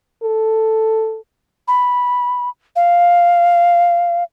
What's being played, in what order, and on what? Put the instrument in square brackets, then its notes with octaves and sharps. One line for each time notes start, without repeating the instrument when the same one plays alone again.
[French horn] A4
[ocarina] B5
F5